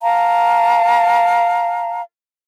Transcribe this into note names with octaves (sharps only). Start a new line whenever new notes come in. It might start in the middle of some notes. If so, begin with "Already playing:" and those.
F5 A5 A#5